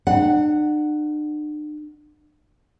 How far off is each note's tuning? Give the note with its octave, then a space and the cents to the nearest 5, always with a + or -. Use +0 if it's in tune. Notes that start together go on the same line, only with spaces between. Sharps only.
D4 +45 F#5 +0